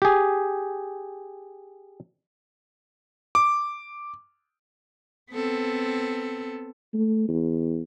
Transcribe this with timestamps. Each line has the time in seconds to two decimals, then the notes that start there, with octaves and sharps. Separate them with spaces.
0.02 G4 G#4
3.35 D6
5.32 B3 C4 A4
6.94 A3
7.29 E2